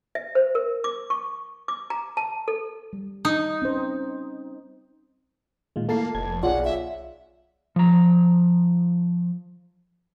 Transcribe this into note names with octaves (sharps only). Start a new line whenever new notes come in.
E5
C5
A#4
D6
C#6
D6
A#5
A5
A4
G3
D#4
C4 C#4 C5
A#2 D#3 G#3 F4
A3 A#3 E4 F4 A4 A5 C7
F1 A5 G#6
B1 F4 G#4 C#5 D5 F#5
E5
F3 A#5